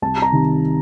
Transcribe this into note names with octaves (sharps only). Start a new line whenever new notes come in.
C2 A5
A#5
C3 D#3